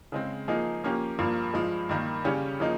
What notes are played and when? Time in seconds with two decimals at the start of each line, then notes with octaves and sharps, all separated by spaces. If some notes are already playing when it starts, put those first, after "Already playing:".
0.12 C#3 G#3 C4
0.48 F3 A#3 D#4 G#4
0.84 F3 A#3 C#4 G4
1.19 G2 F3 A#3
1.54 G2 F3 G#3
1.89 G2 D#3 A#3
2.24 C#3 G3 C#4 G4 C#5
2.60 C#3 F3 A#3 D#4